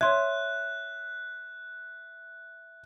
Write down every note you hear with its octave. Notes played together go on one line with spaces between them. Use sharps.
C#5 E5 C6 F#6 G#6